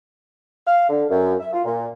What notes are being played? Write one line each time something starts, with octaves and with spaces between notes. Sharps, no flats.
F5
D3
F#2
E5
F4
A#2